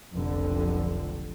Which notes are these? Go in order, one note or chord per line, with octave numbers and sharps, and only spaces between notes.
F1 B1 F2 D3